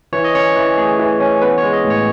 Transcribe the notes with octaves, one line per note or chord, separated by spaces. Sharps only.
E3 C#5
D#5
C#4 C#5
E3
A3 G#4
E3
C#4
B3 B4
C#5
G#3
D#5
A2
C#5